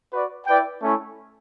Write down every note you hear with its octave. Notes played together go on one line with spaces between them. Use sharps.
F#4 B4 D5
E4 B4 D5 G5
A3 C#4 E4